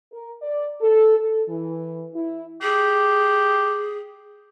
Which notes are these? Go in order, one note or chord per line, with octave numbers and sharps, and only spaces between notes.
A#4
D5
A4
A4
E3
E4
G4 G#4